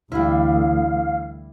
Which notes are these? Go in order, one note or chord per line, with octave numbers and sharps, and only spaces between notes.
D2 E3 G3 E4 F5